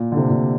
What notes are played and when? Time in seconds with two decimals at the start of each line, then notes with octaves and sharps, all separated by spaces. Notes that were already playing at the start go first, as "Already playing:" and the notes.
Already playing: A#2
0.12 D3
0.17 C3
0.30 A#2